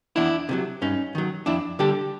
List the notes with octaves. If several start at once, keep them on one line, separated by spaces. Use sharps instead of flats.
E2 D4 E4
C3 D#3 F#3
G2 C#4 D#4
D#3 F#3
F2 D4 E4
D3 G3 G4 A4